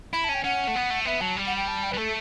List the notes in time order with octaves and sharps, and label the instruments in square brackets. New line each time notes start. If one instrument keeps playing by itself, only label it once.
[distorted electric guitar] E4 [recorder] B5
[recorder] A5
[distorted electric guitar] C#4
[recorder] G5
[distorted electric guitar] C#4 [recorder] F#5
[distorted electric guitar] A3
B3
A3
[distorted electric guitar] B3 [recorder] E5
[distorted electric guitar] F#3 [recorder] A5
[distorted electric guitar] G3
[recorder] F#5
G5
A5
G5
[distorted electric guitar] G3 [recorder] B4
[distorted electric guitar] A3 [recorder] A4